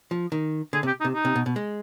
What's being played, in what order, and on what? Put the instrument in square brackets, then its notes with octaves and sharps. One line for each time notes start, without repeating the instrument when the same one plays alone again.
[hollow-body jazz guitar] F3
D#3
[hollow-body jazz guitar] D3 [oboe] G#4
[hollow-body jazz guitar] C3
[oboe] G4
D#4
[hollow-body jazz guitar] C3
[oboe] D#4
[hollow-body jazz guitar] C3
B2
B2
G#3